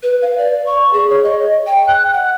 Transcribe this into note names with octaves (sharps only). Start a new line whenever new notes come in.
B4
F5
D5
C#6
G#4
C#5
D#5
G5
F#6
F#5